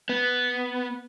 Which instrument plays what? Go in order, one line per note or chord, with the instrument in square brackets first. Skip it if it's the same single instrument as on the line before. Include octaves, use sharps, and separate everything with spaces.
[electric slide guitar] B3